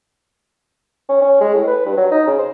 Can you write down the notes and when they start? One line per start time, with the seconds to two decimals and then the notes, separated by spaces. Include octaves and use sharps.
1.09 C#4
1.22 C#4
1.41 G#3
1.54 A2
1.67 B4
1.86 G2
1.97 F#3
2.11 D#4
2.27 C#3
2.39 C5